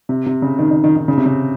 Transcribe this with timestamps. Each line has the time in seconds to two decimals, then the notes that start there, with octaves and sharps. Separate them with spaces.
0.09 C3
0.26 C3
0.42 C#3
0.59 D#3
0.71 D#3
0.84 D#3
0.96 D#3
1.08 C#3
1.17 C3
1.26 C#3